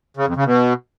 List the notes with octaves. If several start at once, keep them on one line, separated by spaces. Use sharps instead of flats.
C#3
F2
C#3
B2